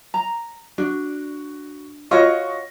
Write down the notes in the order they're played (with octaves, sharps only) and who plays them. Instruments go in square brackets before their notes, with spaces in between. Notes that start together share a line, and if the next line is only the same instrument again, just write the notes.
[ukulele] A#5
[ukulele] D4 [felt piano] F#4
[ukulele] F4 F#4 C#5 [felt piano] D#5 C#6 A#6